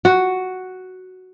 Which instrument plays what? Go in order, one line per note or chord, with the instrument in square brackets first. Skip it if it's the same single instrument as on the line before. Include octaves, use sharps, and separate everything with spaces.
[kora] F#4